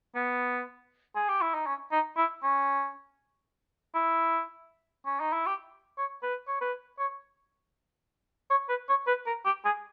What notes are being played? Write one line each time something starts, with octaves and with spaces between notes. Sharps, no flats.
B3
G#4
G4
E4
D#4
C#4
D#4
E4
C#4
E4
C#4
D#4
E4
G4
C#5
B4
C#5
B4
C#5
C#5
B4
C#5
B4
A#4
G4
G#4